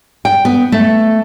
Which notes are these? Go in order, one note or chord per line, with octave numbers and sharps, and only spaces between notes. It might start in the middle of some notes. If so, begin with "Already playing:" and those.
G5
B3
A3